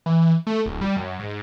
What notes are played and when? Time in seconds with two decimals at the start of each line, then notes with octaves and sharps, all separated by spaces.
0.06 E3
0.47 A3
0.66 D1
0.81 G3
0.97 F#2
1.19 G#2